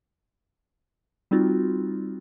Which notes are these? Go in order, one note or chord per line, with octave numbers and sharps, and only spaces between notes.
G3 C4 D#4 F4 F#4